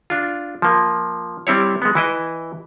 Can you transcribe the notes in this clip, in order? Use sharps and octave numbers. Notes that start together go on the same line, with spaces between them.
D4 F4
F3 A#3
G3 C4 E4 C#5
G#3 B3
E3 E4 D#5